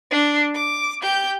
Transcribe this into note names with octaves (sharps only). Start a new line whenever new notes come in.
D4
D6
G4 G6